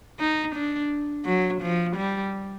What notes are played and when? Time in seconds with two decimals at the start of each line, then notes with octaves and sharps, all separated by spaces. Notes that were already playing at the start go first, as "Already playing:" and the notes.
0.19 D#4
0.55 D4
1.25 F#3
1.61 F3
1.96 G3